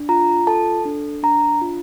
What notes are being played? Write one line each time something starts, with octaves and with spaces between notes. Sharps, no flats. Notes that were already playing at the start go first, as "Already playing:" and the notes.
Already playing: D4
F4 A#5
A4 A5
D4
D4 A#5
F4